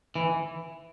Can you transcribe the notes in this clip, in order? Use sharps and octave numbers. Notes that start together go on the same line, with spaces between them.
E3